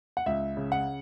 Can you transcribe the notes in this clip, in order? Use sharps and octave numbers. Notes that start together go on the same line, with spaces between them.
F#5
C#2 E5
C#3
F#5